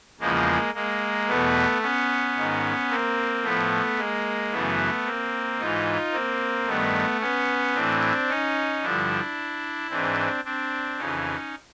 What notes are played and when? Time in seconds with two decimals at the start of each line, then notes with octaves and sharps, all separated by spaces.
0.20 E2 C#3 F3 G#3 A#3
0.74 G#3 A#3
1.28 E2 B2 A3 B3
1.82 B3 C#4
2.36 G#2 D#3
2.90 A#3 C4
3.43 A2 F3 A3 B3
3.98 G#3 A#3
4.52 F#2 C#3 E3 A3 B3
5.05 A#3 C4
5.59 G#2 E3 D#4 F4
6.12 A#3 C4
6.66 G2 D#3 A3 B3
7.20 B3 C#4
7.74 A2 E3 C4 D4
8.29 C#4 D#4
8.82 G2 D3 F3 D4 E4
9.90 G#2 E3 C4 D4
10.44 C4 D4
10.98 F2 C#3 E3 C#4 D#4